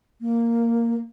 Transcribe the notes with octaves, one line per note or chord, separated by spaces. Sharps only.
A#3